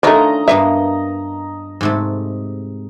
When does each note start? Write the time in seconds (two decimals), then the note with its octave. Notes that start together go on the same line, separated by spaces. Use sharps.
0.03 D#3 A3 C#4 D4 F4 D#5 A#5
0.48 G2 A#3 B3 E5
1.81 G#2 C3 A3